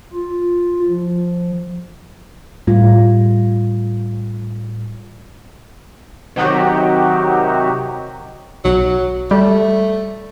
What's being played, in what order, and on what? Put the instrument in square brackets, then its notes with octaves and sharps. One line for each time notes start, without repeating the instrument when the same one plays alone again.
[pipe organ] F4
F3
[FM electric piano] A2 [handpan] G3 F4
[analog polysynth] C3 D#3 F#3 D#4 F#4 G4
[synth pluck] B1 [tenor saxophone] F#3
[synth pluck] G3 [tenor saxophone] A3